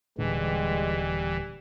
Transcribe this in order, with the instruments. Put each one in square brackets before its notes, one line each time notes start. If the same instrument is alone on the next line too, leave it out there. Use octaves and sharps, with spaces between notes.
[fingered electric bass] D#1 A#2 D3 [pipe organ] E3 [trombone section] G3 [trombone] G#3